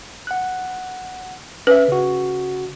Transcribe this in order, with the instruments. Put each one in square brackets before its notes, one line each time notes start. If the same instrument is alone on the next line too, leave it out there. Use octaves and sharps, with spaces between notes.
[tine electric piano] F#5 F#6
[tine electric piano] C#4 E5 [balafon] B4
[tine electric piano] C#3 F#4